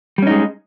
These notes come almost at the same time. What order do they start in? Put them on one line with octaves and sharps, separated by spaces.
G3 C#4 D#4 G#3